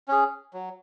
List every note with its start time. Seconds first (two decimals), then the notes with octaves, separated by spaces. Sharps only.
0.08 C#4 G#4
0.54 F#3